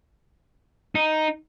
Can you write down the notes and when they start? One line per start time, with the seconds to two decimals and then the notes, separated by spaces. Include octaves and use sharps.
0.95 D#4